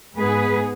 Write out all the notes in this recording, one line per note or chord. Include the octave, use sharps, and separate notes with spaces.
G#2 G#3 B3 G#4 B4